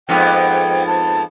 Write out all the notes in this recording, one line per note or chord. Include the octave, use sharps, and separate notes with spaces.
F2 G#2 B3 G5
A5